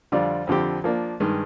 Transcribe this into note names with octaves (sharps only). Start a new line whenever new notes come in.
F2 D3 G3 D4 F4
F2 D3 F3 C4 G4
F3 A#3 D4
G2 D#3 G#3